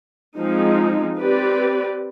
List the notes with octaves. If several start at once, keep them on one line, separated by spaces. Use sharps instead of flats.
F3 G#3 C4 D#4
C4 G4 B4 D5